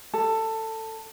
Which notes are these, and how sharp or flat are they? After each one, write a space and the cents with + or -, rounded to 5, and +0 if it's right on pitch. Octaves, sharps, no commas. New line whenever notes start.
A4 +15